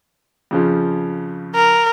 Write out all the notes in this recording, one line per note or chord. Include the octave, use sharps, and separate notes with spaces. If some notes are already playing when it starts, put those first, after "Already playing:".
F2 C#3 F3
A#4